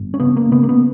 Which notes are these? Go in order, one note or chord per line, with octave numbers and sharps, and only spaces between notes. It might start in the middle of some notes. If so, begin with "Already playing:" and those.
Already playing: G1
C#4
C#3 B3
A#3
C#3 B3
A#3
B3